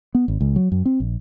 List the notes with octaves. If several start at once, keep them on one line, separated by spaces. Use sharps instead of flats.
B3
G#1
C#2
F#3
F#2
C4
A#1